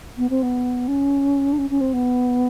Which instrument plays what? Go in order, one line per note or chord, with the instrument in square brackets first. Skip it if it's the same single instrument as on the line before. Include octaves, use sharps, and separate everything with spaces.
[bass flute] B3
C4
B3
C#4
D4
C#4
C#4
C4
B3